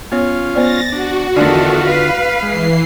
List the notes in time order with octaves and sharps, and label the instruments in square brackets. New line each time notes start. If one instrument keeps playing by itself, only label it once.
[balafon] B3 C#5 [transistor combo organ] C#4 F4
[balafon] B3 C5 D5 [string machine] A6 A#6
[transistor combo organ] D4 [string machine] F#4
[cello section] E2 D#3 A4 [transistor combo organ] D3 F4 [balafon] D4 D5
[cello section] B4 F5
[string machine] E3 C7 [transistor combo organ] G#3